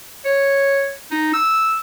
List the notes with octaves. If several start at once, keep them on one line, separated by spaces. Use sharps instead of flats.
C#5
D#4
E6